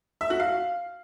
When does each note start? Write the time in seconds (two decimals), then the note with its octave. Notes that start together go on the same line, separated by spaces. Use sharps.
0.21 E5
0.30 F#4
0.40 F5